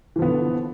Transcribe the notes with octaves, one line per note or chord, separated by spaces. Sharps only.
D3 E3 F3 B3